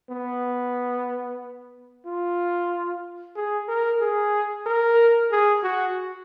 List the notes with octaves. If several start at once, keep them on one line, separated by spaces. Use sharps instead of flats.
B3
F4
G#4
A#4
G#4
A#4
G#4
F#4